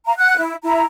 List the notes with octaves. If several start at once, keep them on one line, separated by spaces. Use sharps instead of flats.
F5 A#5
F#5 F#6
E4
E4 A#5